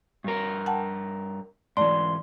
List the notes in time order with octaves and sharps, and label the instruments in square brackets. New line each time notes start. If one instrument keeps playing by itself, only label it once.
[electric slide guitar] G2 A#4
[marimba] F#5 G5 A5
[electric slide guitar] G#2 E3 [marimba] A3 D5 [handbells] C6